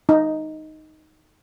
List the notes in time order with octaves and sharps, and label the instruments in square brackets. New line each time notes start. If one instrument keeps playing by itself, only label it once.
[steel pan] D#4